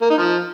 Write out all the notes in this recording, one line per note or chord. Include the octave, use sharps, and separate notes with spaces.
A#3
D#4
F3